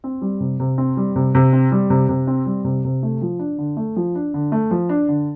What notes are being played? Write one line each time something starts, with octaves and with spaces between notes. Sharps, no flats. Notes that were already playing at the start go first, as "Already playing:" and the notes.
C4
G3
C3
C3
C4
G3
C3
C3
C4
G3
C3
C3
C4
G3
C3
C3
A3
F3
D4
D3
A3
F3
D4
D3
A3
F3
D4
D3